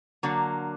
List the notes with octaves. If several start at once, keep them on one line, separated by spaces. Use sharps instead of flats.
D3 F#3 A#3